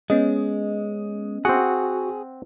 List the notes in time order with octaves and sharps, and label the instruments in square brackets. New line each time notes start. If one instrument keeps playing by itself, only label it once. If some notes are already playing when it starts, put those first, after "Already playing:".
[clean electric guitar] G#3 [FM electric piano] B3 C#4 D#5
[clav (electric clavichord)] C4 F#5 [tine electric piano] F#4 [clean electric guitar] G#4